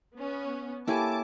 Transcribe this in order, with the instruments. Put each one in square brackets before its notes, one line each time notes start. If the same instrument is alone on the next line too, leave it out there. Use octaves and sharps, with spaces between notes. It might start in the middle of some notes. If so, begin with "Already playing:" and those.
[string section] B3 C#4
[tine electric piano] A#3 C#5 G#5 [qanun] E4 G4 A4 [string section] A5 D6